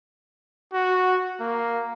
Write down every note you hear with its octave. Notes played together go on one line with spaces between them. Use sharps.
F#4
A#3